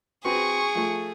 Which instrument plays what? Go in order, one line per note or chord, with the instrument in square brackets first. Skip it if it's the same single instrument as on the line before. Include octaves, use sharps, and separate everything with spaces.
[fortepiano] C4 F#4 B4 [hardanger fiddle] G#4 [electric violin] C#6
[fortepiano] F3 A3